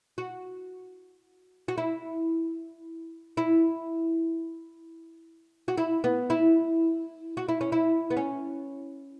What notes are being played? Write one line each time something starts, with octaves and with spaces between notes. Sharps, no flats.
F#4
F#4
E4
E4
F#4
E4
B3
E4
F#4
E4
C#4
E4
B3
C#4